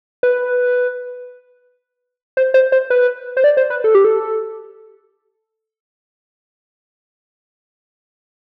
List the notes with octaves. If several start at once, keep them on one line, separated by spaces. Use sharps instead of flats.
B4
C5
C5
C5
B4
C5
D5
C5
B4
A4
G4
A4